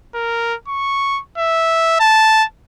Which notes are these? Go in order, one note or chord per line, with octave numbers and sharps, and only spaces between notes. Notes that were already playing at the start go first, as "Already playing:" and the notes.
A#4
C#6
E5
A5